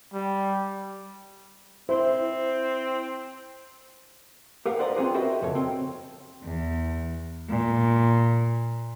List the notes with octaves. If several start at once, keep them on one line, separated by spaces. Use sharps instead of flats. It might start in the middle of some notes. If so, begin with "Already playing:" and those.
G3
C4 E4 C5
G4 A#4 B4 F5 F#5
B4 C5 D5 D#5 G5 A#5
C4 C#4 F4 G#4 B4 C5
F#4 G4 A#4 B4 D#5 E5
F2 C#3 A4 A#4 C#5
C4 G5
E2
A#2